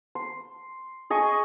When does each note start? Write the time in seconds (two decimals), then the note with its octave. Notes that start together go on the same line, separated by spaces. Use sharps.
0.15 C6
1.10 G#4 D#5 C#6 D#6